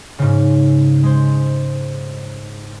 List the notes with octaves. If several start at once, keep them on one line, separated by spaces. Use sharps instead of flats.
G#2 C#3
G#3 C5